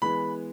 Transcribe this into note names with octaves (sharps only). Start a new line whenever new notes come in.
E3 G#3 B3 B5